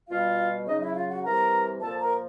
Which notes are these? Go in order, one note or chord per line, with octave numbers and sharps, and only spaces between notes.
B2 G3 F4 F5
C#3 F#3 D#4 D#5
E4 E5
F4 F5
F#4 F#5
C3 E3 G3 A#4 A#5
A#2 F3 A4 A5
A#4 A#5